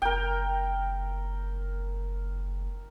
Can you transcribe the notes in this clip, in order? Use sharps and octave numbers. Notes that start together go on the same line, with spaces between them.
F#1 A#4 G5